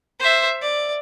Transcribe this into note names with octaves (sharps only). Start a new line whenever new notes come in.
C5 E5
D5